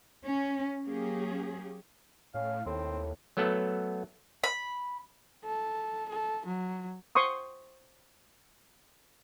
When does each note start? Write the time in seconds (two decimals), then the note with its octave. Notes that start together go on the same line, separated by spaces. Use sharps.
0.24 C#4
0.86 F#3 A#3 C#4 G4 G#4
2.34 A2 C#4 F5
2.66 D#2 A2 C4
3.37 F#3 A3 B3 A4
4.44 B5
5.45 A4
6.09 A4
6.46 F#3
7.15 C5 C6 C#6 D#6